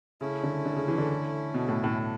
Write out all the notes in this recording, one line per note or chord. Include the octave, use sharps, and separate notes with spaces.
C#3 A3 C#4 E4
D3
D3
C#3
E3
D3
B2
A2
A2
D4 A4